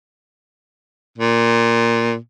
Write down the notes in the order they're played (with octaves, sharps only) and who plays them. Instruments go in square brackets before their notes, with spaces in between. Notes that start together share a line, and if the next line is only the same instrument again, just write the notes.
[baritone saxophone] A#2